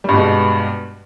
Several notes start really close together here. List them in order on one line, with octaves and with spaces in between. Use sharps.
G3 G2 B2 G#3